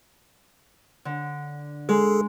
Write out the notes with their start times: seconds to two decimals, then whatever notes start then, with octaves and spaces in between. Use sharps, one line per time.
1.05 D3
1.89 G#3 G#4 A4